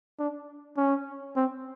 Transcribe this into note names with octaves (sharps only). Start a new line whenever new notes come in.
D4
C#4
C4